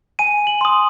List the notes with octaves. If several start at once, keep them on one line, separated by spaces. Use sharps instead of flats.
G#5 D#7
F#7
C6 D#6